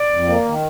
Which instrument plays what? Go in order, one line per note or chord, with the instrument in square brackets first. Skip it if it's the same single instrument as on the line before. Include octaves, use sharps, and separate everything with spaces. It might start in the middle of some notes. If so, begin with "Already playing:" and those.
Already playing: [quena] D5
[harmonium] F2
A#3
D#3